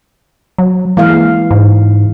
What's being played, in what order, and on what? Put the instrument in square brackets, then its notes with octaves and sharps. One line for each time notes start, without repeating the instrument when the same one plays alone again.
[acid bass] F#3
[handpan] E3 G#3 F5 [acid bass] A#3
[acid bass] G#2